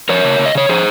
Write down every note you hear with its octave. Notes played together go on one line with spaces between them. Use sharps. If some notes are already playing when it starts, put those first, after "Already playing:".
F3 A#4 C#5
C#3
C#3
D#5
C#3 C#5
F3 G#4 C5